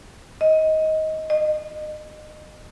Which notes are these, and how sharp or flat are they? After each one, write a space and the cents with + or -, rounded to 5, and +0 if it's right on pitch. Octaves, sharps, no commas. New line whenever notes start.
D#5 +15
D#5 -30